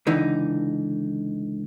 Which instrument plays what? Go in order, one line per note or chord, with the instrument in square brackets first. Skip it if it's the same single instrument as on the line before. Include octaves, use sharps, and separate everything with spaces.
[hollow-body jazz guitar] C#2 D3 E3 D#4